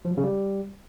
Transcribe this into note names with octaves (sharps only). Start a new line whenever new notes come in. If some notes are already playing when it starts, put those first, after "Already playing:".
F3
F#3
C#3
G3